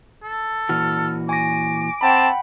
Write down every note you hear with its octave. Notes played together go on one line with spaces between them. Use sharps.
A4
A#2 E3 F#4 F6
G#5 C#6 D6 A#6
C4 F#5 G5 A5 B5